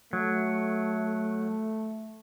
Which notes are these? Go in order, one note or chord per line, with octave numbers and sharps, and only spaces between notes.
F#3 A3